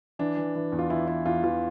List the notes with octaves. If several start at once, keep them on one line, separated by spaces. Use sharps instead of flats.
E3 D4
E3
E3
E2
F4
E3 E4
E3 E4
E2 F4
E3 F4